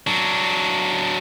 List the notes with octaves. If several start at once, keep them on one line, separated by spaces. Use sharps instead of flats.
F#3 D4